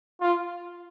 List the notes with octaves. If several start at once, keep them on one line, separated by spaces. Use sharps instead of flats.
F4